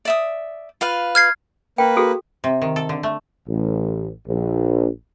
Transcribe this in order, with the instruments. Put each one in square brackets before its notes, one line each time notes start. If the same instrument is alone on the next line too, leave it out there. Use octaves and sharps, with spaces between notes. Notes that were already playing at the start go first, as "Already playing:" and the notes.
[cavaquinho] D5 E5 D#6
F4 B4 F5
[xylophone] F6 G#6 C7
[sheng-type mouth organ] A#3 B4 [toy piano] G5
[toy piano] F#4 G#4 A4
[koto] C3
D#3
A4
D3
A3
[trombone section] A1
A#1